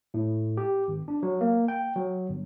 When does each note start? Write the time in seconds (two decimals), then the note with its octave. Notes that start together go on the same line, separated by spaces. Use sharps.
0.14 A2
0.57 G4
0.88 G#1
1.08 D4
1.23 F#3
1.41 A#3
1.68 G5
1.96 F#3
2.29 G1